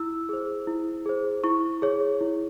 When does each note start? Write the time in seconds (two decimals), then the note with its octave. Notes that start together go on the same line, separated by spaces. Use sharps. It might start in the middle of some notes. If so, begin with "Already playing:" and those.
Already playing: E4 E6
0.29 G#4 C5
0.67 E4
1.06 G#4 C5
1.44 E4 C#6
1.82 G#4 C#5
2.21 E4